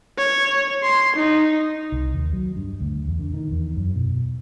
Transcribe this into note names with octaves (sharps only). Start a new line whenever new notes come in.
C#5
C6
D#4
C2
D#2
F#3
G2
D2
E2
D3
D#3
E2
F#2
B2